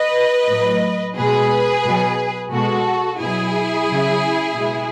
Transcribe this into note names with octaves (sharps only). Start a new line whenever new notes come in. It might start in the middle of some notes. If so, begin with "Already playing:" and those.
Already playing: B4 D#5
A2 F#3
B2 G#3 G#4 B4
B2 F#3
B2 G#3 F#4 A4
B2 F#3 E4 G#4
C#3 F#3
B2 G#3